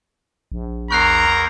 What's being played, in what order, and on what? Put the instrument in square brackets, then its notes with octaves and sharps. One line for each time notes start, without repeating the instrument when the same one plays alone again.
[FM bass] A#1
[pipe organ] E2 A#4 G6 [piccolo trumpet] A#5 [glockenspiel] C#6 F#6 C7